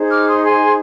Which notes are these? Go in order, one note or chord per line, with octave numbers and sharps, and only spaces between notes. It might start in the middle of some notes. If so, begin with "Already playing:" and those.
Already playing: D#4 G#4 C5
D6 F6
C6 D#6
G#5 C6